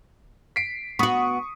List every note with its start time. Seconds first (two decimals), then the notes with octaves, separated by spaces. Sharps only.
0.56 B6 C7 D7
0.99 B3 F#4 C#6 D#6